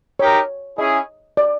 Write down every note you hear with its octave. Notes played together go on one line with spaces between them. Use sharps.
D#4 G4 A#4 C#5
C#4 E4 G#4 D#5
D5